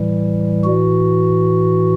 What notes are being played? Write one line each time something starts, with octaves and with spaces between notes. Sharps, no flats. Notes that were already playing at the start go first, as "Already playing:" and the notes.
Already playing: A2 E3 G3
F#4